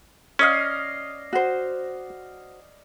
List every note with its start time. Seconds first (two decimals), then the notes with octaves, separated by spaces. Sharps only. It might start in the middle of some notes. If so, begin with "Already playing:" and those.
0.39 C#4 D5 D#5 F5
1.33 F#4 C5